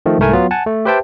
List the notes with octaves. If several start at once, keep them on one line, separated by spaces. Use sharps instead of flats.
D#3 F3 A3
C2 G#2 A3 A#4 G#5
F#3 B3 F4
F#5 G#5 A5
A3
G4 B4 C5 E5 G5 A5